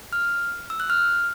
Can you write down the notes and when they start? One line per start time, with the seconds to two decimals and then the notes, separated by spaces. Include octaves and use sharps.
0.13 F6
0.70 E6
0.80 F#6
0.90 F6